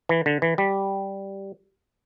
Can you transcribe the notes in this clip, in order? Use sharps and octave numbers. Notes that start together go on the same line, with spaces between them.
E3
D3
E3
G3